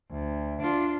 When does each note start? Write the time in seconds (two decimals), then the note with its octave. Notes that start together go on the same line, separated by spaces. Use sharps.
0.11 D2
0.62 D4 F4